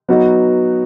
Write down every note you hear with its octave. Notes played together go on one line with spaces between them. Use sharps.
F#3 B3 D#4 F#4 B4